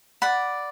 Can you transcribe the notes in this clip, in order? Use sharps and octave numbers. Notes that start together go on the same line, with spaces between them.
D5 F#5 B5